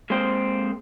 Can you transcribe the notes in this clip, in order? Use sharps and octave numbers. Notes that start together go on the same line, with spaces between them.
G#3 A#3 C4 C5